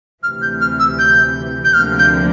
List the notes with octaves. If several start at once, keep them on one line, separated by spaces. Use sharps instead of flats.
D2 C3 E3 F6
G6
F6
E6
G6
G6
D2 C3 F3 A#3 D4 F6
G6